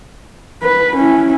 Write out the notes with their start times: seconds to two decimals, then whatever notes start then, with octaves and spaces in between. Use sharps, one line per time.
0.63 B4
0.96 C#4 E4